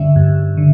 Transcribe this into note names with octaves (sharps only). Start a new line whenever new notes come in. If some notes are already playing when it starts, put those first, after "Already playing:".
Already playing: G2 D3 G3 C#4 E5
G2
D3